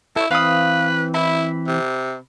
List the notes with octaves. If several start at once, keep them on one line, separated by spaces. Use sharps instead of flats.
E4 A4 C#5
E3 C4 B4 F5 B5 D#6
E4 B5
C3